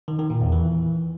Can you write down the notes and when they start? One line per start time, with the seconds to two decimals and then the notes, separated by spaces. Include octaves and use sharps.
0.08 D#3
0.19 D#3
0.30 A#2
0.41 E2
0.52 E3